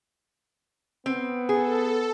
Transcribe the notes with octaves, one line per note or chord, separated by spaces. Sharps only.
B3 C4
G#4 A4